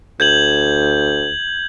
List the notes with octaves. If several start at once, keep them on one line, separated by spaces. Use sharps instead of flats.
D2 G6 G#6 F#7